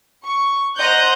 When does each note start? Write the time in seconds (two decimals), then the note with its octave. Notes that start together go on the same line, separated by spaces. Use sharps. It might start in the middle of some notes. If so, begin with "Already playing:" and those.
0.24 C#6
0.77 C5 D#5 F#5 A#5 F#6 G6